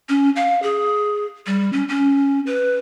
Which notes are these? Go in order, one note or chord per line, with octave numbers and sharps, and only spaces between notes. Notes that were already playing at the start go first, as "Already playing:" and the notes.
C#4
F5
G#4
G3
C#4
C#4
B4